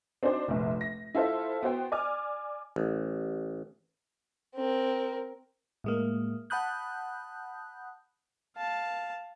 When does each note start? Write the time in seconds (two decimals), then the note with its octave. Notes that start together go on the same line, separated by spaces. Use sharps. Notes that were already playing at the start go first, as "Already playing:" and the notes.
0.23 C4 D4 D#4 F#4 C5 D5
0.48 F1 A#1
0.81 A#6
1.15 E4 F4 A4 C5 E5
1.63 B3 F#4 C5 G5
1.92 D5 G#5 D6 F6
2.76 A1
4.55 C4 A#4
5.84 A2 G#3 A#3
6.50 F#5 A5 B5 D#6 F#6 G6
8.57 F5 A5